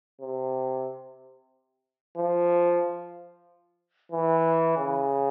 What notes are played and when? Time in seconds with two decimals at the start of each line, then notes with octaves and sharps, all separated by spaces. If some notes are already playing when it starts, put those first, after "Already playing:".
0.21 C3
2.17 F3
4.12 E3
4.78 C#3